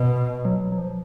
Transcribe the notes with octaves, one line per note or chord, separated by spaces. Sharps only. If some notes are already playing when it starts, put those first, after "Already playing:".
Already playing: B2
F#3
F#3
F3